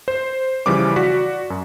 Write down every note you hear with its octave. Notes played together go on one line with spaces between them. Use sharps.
C5
C#3 E3 F3 G3 B4 D6
F#4 D5 B6
F#2